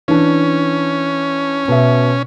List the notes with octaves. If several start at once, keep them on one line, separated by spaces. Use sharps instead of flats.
E3 C#4 D4
B2 E5